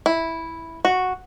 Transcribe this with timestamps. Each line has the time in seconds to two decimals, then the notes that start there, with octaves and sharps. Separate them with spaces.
0.06 E4
0.85 F#4